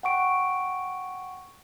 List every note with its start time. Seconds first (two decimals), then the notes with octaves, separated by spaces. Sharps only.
0.03 F#5 G5 C#6 D7